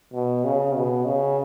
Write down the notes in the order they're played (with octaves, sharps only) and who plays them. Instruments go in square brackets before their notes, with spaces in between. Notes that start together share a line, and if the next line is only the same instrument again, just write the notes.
[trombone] B2
C#3
B2
C#3